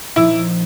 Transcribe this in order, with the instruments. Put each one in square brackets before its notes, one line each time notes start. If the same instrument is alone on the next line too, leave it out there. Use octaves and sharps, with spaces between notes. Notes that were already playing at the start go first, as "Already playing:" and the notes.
[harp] A#2 F3 A#3 D#4 [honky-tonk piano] E4